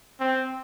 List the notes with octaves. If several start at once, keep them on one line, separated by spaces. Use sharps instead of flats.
C4